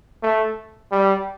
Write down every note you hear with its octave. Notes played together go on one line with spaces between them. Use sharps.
A3
G3